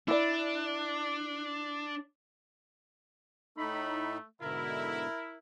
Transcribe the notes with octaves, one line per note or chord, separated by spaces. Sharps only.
D4 E4 D5
A2 A3 D#4 B5
G#2 B2 D3 E4 A#4